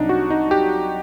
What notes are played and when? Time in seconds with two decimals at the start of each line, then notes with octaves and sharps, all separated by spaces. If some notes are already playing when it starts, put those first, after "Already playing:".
Already playing: C2 C3 F#3 D4 D#4
0.09 F#4
0.30 D#4
0.51 G4